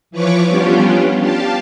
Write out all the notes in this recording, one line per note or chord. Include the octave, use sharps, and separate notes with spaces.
E3 F3 B4 C#5 C#6 D6
G3 B3 C#4 D4 F4 G4
G4 F5 A5